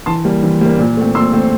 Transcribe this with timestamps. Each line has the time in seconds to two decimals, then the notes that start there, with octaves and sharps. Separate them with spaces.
0.06 E3 A5 C6
0.25 G3 A#3
0.43 E3
0.61 G3 A#3
0.79 A#2
0.97 A3 C4
1.15 A#2 C6 E6
1.33 A3 C4